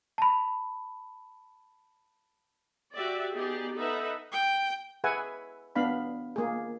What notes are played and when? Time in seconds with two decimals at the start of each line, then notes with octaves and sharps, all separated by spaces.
0.18 A5 B5
2.96 F#4 G4 D5 E5
3.35 B3 D#4 G4 G#4 D5
3.77 D#4 A4 B4 E5 F#5
4.32 G5
5.04 G#4 B4 E5 F#5 G#5
5.76 B3 D4 F5 B5
6.36 A#3 G#4